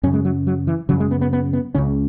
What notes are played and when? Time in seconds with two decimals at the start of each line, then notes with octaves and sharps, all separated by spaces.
0.03 F#2 C#4
0.06 C#3
0.14 G#3
0.25 F#3
0.47 F#3
0.67 E3
0.89 C#3 F#3
0.93 F#2
1.00 G#3
1.11 B3
1.21 B3
1.33 B3
1.53 B3
1.75 C#2 C#3 C#4